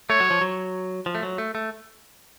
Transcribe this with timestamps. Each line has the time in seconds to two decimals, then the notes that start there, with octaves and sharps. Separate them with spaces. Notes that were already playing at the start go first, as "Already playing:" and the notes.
0.10 A3 C#5
0.20 F#3
0.31 F3
0.41 F#3
1.06 F3
1.15 A3
1.23 F#3
1.38 A3
1.55 A3